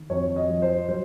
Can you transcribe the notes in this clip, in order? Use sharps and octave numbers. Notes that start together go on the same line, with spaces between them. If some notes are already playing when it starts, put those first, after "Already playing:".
Already playing: D#3
F2 C#5
D#5
F3
C5
F#3 C5